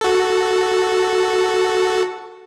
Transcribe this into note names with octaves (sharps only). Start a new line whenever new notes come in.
F#4 A4